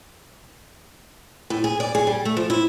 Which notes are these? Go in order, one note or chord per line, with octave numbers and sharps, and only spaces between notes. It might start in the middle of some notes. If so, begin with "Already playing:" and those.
A2
G#4
D5
G#4
G3
A3
F3
E4